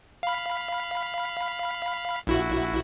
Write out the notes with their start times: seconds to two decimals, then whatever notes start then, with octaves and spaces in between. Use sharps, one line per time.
0.23 F5 B5
2.27 A#1 E4 F#4